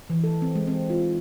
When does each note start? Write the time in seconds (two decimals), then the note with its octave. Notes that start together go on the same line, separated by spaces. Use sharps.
0.10 E3
0.24 A4
0.42 C4
0.55 G#3
0.67 C4
0.90 F4
1.03 D#4